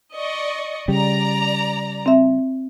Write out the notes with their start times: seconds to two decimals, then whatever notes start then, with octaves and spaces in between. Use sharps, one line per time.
0.16 D5 D#5 C#6
0.88 C#3 G3 D5 A#5
2.06 C4 E5